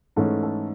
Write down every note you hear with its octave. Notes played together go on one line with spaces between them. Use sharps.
G#2 E3 A3 C#4 A4
A4